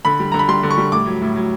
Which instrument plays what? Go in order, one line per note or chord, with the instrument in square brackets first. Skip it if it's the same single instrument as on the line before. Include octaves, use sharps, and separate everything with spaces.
[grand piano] D3 B5
G3
D3 A#5
B5
G3 C6
D3
C#6
G3
A2 D6
F#3
A2
F#3